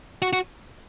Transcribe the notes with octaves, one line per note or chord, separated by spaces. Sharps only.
F#4
F#4